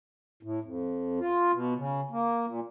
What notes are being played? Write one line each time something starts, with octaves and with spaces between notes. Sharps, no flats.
A2
F2
F4
B2
C#3
A#3
A#2